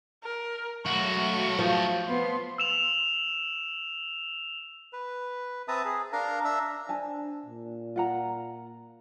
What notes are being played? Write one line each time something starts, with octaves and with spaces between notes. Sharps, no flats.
A#4
F#3 A3 E4 F#4 C#6
F3
B3 C6
E6 E7 F7
B4
C4 B4 E5 A5 A#5 D#6
G#4
D4 A#4 F5 A#5
D4 E5 A#5 E6
D4 C5 G#5 A5
A#2
F4 F#5 A#5